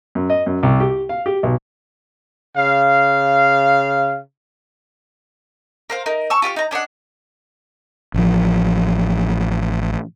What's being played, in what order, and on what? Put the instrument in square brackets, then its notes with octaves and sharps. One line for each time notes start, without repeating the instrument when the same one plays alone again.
[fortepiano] F#2
D#5
F#2
C2
G4
F5
G4
B1
[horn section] C#3 F5
[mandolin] A#4 C5 F5
D#4 A#4
A5 C#6 E6
F4 G4 F5 C#6
D#4 A#5
C#4 D4 D#5 F#5
[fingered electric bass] A1 F3